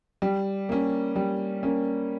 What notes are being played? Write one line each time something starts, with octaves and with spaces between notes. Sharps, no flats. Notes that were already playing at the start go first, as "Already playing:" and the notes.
G3
A#3 C#4
G3
A#3 C#4